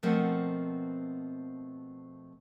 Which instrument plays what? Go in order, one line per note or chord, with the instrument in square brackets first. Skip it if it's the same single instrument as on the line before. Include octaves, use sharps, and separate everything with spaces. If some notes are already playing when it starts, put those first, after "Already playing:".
[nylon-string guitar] B2 F3 A3 C4 A#4 F#5